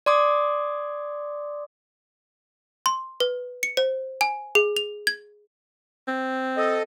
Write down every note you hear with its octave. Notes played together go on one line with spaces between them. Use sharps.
D5 C6 D6 D#6
C6
B4
C#7
C5
G#5
G#4
F7
G#6
C4
A4 D#5